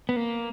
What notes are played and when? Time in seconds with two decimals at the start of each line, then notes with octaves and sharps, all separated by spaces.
0.09 B3
0.16 A#3